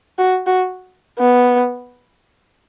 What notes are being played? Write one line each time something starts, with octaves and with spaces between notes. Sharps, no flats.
F#4
F#4
B3